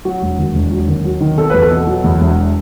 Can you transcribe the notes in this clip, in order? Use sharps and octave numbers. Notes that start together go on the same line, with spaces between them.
F#3 F#4
E1
D#2
E1
F#3
D#2
F#3
D#3
B2 A4
E2 B4
A4
B2
F#3
E2
E1